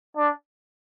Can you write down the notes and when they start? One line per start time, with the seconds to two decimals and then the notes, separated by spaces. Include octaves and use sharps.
0.17 D4